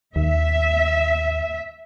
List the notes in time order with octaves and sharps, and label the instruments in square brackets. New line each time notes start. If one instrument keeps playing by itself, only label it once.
[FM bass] D#2 [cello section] E5